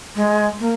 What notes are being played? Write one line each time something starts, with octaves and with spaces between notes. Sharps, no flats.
G#3
A#3